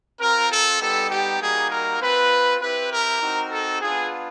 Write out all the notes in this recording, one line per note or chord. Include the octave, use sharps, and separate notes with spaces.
C4 F4 A#4
A4
G3 B3 D#4 G4 A4
G4
G3 A#3 D#4 F#4 G#4
A#4
C4 F4 B4
C4 E4 G4 B4
A#4
C4 D#4 F#4
A4
B3 D4 F4 G#4